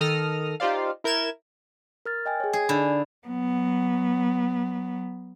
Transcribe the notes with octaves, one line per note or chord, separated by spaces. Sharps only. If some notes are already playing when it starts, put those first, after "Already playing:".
D#3 A4 D#6 F6 A#6
D#4 F4 G4 C5 D5 F5
E4 A#4 G6 G#6 E7
A#4 F6 A6
D#5 G5 G#5
G#4 C#5
G#4 G#5
D3 D#4 B5
F#3 B3